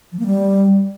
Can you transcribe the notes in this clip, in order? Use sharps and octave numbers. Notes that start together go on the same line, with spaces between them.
F3
A#3
G3